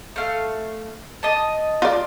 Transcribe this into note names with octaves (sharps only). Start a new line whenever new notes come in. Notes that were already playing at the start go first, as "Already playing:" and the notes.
A3 F5
D#5 A5
F4 D5